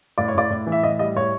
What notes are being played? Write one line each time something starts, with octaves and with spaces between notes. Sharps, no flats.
A2 D5
C#5
A2 D5
A2
E3
E5
A2 D#5
G3 D#5
A2 C#5